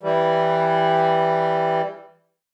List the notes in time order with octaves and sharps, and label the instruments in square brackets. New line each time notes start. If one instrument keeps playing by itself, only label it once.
[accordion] E3 G3